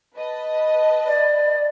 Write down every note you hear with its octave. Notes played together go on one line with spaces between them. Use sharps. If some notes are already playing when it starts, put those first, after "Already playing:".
B4 D#5 A5
D5